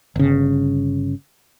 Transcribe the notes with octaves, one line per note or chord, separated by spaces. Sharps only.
G1 C#3